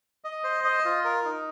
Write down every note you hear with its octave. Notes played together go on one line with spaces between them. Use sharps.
D#5
C5
D#5
F4
A#4
D#4